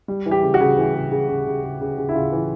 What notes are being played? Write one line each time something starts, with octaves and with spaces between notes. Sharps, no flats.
G3
E3
G4
C#3
F#4
C#3
E3
C#3
C#3
C#3
C#3
C#3
C#3
C#3
E4
C#3 F4
E3